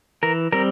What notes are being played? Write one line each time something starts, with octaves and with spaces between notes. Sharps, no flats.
E3 A#4
G3 C4 A#4